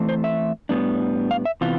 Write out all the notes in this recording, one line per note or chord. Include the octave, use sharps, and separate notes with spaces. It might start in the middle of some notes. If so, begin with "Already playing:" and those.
Already playing: E3 A3 C4
C5
E5
A2 G3 B3 D4
F5
E5
C3 E3 B3 F4